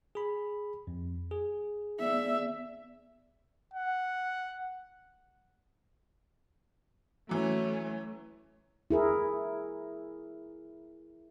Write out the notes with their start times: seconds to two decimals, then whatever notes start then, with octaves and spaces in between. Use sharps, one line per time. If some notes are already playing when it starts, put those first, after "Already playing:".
0.15 G#4 B5
0.87 F2
1.31 G#4
2.00 B3 D5 E5
3.74 F#5
7.29 E3 F#3 A3 C#4
8.90 E4 G#4 A#4